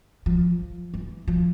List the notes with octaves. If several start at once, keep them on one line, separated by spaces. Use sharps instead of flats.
F3
E3
F3